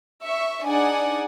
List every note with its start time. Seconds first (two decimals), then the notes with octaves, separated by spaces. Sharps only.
0.24 E5 C#6
0.65 D4 D#4 G#4 D5 F#5 G#5